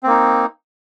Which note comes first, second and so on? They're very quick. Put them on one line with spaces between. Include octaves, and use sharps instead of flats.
C4 A#3 D#4